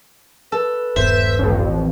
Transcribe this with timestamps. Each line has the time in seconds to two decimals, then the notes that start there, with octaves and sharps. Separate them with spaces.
0.52 A4 B4
0.96 D#1 G2 B3 C5 E5
1.39 A1 F2